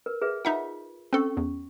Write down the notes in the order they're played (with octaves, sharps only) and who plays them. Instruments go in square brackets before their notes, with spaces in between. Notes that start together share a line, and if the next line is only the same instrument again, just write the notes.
[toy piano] A#4 B4
G#4 B4 E5
[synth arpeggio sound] D#4 E5 F#5 [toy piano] F4
[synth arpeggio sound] C4 A4 [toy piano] C#4 C#6
[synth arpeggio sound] E2